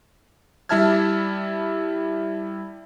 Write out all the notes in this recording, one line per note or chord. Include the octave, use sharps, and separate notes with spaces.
G3 E4 E5 A5 F6 G#6